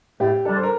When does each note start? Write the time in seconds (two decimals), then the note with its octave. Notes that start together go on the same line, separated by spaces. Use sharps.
0.20 A2 G4
0.45 G3 D4 A4
0.57 C5
0.63 A#4